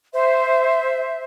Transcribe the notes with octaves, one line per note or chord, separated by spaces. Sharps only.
C5 E5